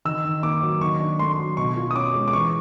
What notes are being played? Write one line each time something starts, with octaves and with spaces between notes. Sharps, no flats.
D#3 E6
D#3
A#3 D6
F#3
D#3 C#6
D4
A3 C6
F#3
B2 C#6
F4
D#6
C#4 D6
G#3
D6
E3 C#6